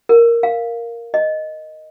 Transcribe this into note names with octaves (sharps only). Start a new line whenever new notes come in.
A#4
F5
D#5